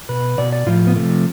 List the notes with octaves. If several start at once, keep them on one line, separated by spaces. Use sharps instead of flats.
B2 B4
B2 D5
D5
A2 F3 F4
B3
C3 F3 A3